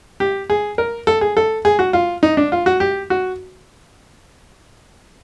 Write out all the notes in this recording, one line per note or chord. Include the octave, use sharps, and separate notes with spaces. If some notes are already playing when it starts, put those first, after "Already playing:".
G4
G#4
A#4
A4
G#4
A4
G#4
F#4
F4
D#4
D4
F4
F#4
G4
F#4